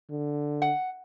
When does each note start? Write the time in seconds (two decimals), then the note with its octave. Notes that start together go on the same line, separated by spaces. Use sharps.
0.10 D3
0.62 F#5